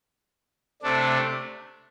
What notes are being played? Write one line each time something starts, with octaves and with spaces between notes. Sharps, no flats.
C3 A3 D4